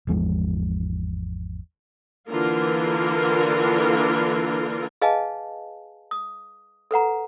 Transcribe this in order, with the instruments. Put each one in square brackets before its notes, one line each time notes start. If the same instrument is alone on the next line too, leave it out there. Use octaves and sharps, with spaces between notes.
[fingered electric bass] G#1 E2 F3 G#3
[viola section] D3 E3 A#3 F4 A#4
[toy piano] G#4 B4 D#5 F5 G#5 A5
D#6
A4 B4 F#5 A#5